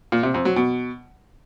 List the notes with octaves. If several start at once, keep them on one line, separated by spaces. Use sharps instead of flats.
A#2
C3
F2
F#3
B2